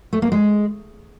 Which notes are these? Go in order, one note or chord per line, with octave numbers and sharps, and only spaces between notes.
A3
A#3
G#3